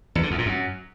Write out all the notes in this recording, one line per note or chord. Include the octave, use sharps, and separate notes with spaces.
E2
D3
E2
A#2
F#2